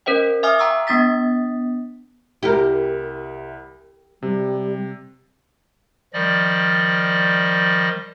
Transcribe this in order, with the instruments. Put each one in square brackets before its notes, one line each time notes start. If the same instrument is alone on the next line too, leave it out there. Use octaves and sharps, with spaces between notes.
[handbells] C#4 A#4 C5 D#5 G5
E5 F5 G#5 D6 D#6 F6
G5 A#5 C#6 E6
B3 D4 D#6 A6 B6
[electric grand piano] C2 E4 [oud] G4 A#4
[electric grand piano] C3 [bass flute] G3
[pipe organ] D#3 F3 G3 D5 D#5